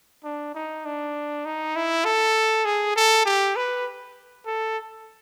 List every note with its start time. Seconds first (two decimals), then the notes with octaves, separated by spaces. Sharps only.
0.24 D4
0.55 D#4
0.85 D4
1.45 D#4
1.76 E4
2.05 A4
2.66 G#4
2.96 A4
3.26 G4
3.56 B4
4.46 A4